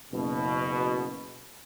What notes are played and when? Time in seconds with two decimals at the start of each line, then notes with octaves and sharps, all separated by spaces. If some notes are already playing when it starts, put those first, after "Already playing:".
0.12 F#1 B2